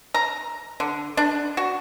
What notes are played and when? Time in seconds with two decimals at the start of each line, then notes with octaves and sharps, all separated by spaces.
0.14 A#5
0.80 D3
1.17 D4
1.57 F#4